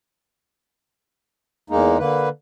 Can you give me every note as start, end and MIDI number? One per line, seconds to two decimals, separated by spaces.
1.70 1.98 40
1.70 1.98 56
1.70 1.98 58
1.70 1.98 63
1.98 2.29 50
1.98 2.29 58
1.98 2.29 71